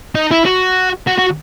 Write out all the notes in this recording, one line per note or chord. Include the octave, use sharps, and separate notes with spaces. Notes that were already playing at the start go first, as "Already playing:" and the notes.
D#4
E4
F#4
F#4
F#4